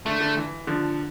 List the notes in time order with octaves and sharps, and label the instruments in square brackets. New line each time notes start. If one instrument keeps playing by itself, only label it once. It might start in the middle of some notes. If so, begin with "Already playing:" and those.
[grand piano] D3 [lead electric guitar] A3
[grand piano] D3
E3
D3 F3